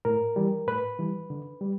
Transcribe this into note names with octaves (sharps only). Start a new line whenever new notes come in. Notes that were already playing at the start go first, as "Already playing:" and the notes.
A2 A#4
E3 G3
A2 B4
E3 G3
D3
G3